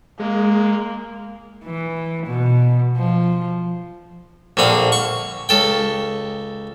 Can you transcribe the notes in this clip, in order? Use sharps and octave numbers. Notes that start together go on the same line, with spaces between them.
G#3 A#3
E3
B2
F3
A#1 D3 C4 F5
C#6
C#2 A4 G5